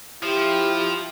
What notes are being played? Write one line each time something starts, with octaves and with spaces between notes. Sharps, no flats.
F3 E4 G4